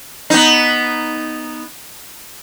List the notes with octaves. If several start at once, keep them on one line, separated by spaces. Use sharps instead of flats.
B3 D#4